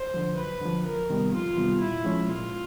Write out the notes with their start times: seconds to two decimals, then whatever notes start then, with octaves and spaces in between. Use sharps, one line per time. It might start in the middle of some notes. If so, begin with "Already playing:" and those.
Already playing: C5
0.14 D3 F3
0.37 F#2 B4
0.61 D3 F3
0.85 F2 A#4
1.10 C3 D#3 G3 B3
1.33 F2 F4
1.56 C3 D#3 G3 B3
1.80 A#2 E4
2.05 F3 G#3 C#4
2.28 A#2 F4